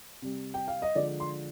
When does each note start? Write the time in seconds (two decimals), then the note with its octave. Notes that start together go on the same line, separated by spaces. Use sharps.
0.22 C3 G3
0.54 G5
0.68 F5
0.82 D#5
0.96 D3 F3 G#3 D5
1.20 C6